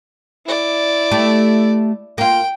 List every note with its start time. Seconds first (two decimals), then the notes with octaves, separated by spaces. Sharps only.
0.46 E4 D5
1.11 A3 G4
2.18 A#3 F4 G5